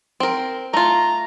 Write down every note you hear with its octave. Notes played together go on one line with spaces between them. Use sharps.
C4 A#4
A3 F4 A#5